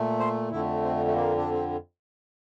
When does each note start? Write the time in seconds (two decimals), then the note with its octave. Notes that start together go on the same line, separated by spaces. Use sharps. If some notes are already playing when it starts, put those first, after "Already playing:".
Already playing: A#2 A3
0.19 C5
0.51 F2 D3 A3 E4
0.82 C4
1.06 A3
1.14 A#3
1.37 D4
1.51 C4